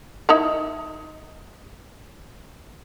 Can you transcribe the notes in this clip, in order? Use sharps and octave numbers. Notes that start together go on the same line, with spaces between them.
D#4 E4 A#4